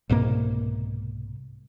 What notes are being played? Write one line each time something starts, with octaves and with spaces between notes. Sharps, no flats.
C2 G#2 B2 A#3